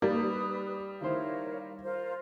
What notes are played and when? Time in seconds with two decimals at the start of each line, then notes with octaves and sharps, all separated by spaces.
0.02 G3 A#3 D#4 B4 D5 D#6
1.01 D#3 E4 A#4 C5 C#5 F5
1.83 F4 A#4 C5